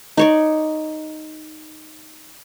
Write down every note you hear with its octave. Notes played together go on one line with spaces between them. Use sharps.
D#4 C#5 D5